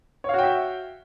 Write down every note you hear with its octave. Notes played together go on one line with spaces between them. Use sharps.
F#4 C#5 E5 F5 G5